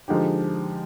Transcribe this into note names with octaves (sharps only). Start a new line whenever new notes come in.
D3 F3 G#3 D#4 G4